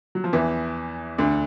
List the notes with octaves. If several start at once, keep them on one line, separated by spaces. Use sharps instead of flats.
F#3
F3
E2 E3
D2 D3